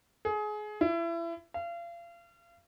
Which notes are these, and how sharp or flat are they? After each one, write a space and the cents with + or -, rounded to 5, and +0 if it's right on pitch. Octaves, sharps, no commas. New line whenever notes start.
G#4 +25
E4 +30
F5 -35